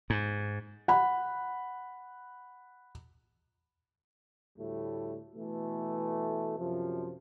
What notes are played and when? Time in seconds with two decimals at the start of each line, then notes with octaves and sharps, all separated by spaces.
0.10 G#2
0.88 F#5 B5
4.59 D2 A2 G3 A3
5.36 B2 E3 A3
6.60 F#2 C3 F3